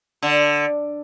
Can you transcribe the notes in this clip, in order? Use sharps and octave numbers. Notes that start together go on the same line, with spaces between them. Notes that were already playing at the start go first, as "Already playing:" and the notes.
D3